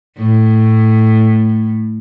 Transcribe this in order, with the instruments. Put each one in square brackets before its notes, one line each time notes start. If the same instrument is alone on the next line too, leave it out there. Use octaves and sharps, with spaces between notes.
[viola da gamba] A2